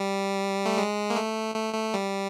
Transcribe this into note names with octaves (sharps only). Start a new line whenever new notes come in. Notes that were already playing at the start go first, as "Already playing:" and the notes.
Already playing: G3
A3
G#3
A#3
A3
A3
A3
G3